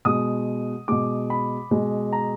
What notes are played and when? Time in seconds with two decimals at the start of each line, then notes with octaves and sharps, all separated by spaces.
0.05 B2 G#3 D#6
0.88 B2 G#3 D6
1.30 B5
1.71 B2 G#3
2.13 A#5